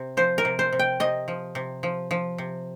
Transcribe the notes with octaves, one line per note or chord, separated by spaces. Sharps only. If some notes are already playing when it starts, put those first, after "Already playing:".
Already playing: C3
F3 C5
A#4
C3
C5
C3
G5
C3 D#5
F3
C3
F3
F3
C3